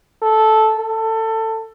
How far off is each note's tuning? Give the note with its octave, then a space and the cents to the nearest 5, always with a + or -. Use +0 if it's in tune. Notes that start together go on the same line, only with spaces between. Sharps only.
A4 -10
A4 +20